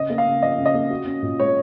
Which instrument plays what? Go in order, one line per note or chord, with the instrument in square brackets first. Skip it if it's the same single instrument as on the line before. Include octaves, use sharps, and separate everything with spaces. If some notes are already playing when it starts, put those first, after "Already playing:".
Already playing: [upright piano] C#3 C#4 [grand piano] D#5
[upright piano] A#3
[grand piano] F5
[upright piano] C#3
[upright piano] F3 [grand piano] D#5
[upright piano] C#3
[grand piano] D#5
[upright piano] A#3
F#4
C#4
A#2
[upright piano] G#3 [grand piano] C#5